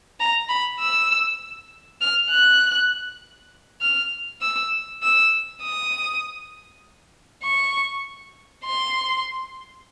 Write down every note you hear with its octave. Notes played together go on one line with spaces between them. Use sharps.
A#5
B5
E6
F6
F#6
F6
E6
E6
D#6
C#6
C6